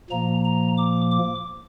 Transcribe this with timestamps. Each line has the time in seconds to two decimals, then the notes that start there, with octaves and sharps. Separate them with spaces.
0.10 A#2 F3 A#3 A#5
0.44 A#5
0.77 D6
1.11 D6